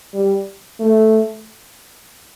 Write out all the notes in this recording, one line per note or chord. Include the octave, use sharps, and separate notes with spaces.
G3
A3